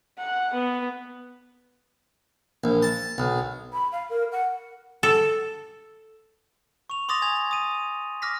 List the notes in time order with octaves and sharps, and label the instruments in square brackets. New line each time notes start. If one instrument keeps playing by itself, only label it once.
[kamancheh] F#5
B3
[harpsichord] A#1
A5
B1
[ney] B5
F5
A#4
F#5
[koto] A4
[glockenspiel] C#6 F7
C6 D6 D#6 A6 A#6 F7
G#5 G#6 F7
D#6 D#7
D6 F6 A#6 B6